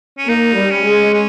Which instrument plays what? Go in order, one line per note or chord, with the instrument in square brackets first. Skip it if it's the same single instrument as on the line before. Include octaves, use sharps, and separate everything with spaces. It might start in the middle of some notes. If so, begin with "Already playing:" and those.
[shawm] C#4
[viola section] A#3 [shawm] D#4
[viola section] G3
[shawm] C#4
[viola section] G#3
[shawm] C#4